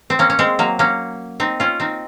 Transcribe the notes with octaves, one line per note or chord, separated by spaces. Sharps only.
C4
A#3 C#4
C#4
G#3 C4
F#3 A#3
A#3 C#4
C4 D#4
C#4 F4
C4 D#4